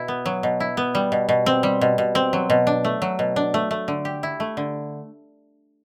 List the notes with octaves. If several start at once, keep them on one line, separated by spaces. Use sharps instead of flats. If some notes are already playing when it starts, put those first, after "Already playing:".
Already playing: B2 E4
B3
F#3
B2
E4
B3
G3
B2
B2
C4
G3
B2
B2
C4
F#3
B2
D4
A3
F#3
B2
D4
A3
A3
D3
G4
E4
A3
D3